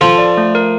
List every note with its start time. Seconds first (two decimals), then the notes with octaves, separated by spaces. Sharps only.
0.01 F3 F4 A4
0.18 D5
0.37 A3
0.55 A#4